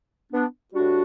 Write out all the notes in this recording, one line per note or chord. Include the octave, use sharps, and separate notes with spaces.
B3 D4
A2 G3 D4 F#4